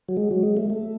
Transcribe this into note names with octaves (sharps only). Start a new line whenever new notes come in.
F#3
G#3
F#3
G#3
A3
A3